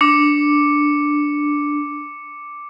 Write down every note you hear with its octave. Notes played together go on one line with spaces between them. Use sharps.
D4 D6 C#7